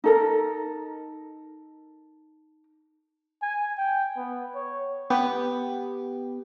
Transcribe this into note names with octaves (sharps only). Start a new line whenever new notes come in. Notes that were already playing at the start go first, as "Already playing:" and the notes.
D#4 A4 A#4
G#5
G5
B3
C#5
B3 G4